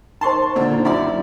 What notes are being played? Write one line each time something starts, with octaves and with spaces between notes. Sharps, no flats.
D#4 A#4 C5 A5 C6 C#6
A#2 D3 D#5
D#4 E4
F#2 E4 F4 D5